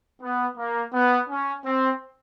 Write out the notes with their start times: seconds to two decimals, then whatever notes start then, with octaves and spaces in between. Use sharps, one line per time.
0.22 B3
0.58 A#3
0.93 B3
1.29 C#4
1.65 C4